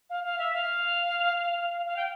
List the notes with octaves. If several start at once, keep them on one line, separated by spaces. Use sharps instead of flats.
F5
F5
E5
F5
F5
G5